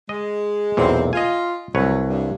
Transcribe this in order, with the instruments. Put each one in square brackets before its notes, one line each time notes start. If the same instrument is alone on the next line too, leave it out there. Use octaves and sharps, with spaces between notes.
[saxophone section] G#3 [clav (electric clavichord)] D#5
[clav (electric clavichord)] B1 E2 A#2 [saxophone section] C4
[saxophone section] F4 [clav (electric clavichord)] D#5 G#5
[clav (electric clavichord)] C2 B4 C#5 [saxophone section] F#3
[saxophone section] G2